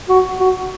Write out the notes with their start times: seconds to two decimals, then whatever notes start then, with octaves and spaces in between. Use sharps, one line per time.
0.09 F#4
0.40 F#4